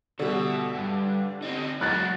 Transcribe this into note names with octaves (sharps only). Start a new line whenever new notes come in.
B2 D3 G3 E5
G2
D4
C4 D#4 D#5
F#3 G#3 F#4 F#6 A6